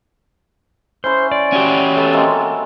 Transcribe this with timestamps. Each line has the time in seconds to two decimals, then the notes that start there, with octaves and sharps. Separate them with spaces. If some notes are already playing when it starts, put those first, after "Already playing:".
1.04 C#4 E4 C5 C6
1.32 D5
1.52 C#4 F#4 G4
1.97 A3 B3 A4 C#5
2.13 G#3 A#3 C4